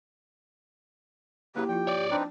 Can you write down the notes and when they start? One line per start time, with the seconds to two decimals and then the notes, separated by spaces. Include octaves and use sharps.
1.56 C#3 F#3 A#3 E4 G4 B4
1.69 F3 E4 F4 G5
1.87 C#5 D5
2.11 C4 D4 D#4 B4